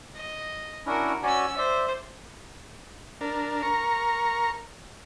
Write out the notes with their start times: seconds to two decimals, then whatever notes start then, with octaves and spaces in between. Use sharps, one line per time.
0.15 D#5
0.86 C#4 D4 E4 F#4 A#4
1.23 C#4 F#4 D5 G#5 E6
1.57 C5 D5 E5
3.21 D4 A#4
3.63 A#4 A#5 C#6